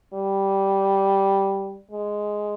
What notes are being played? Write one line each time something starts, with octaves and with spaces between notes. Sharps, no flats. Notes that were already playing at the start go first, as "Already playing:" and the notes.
G3
G#3